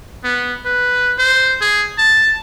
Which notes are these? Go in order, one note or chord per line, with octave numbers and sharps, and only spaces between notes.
B3
B4
C5
G#4
A5